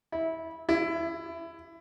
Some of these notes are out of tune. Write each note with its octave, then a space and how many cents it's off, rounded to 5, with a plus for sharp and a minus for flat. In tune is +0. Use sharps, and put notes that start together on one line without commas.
E4 -15
E4 +20